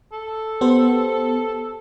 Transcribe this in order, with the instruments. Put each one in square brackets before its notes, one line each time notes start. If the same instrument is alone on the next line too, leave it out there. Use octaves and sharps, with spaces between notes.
[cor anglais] A4
[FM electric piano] B3 G4 C5